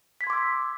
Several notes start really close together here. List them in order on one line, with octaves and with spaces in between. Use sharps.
B6 G#6 C6 D6 E6